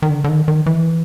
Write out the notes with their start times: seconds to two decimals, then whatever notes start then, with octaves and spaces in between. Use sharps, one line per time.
0.02 D#3
0.10 D3
0.24 D3
0.29 D#3
0.48 D#3
0.66 E3